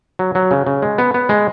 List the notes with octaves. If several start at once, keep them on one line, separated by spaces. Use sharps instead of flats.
F#3
F#3
C#3
C#3
G#3
B3
B3
G#3